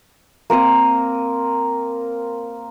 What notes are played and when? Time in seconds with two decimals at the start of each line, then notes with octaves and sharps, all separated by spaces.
0.50 A#3 C4 A#4 D#6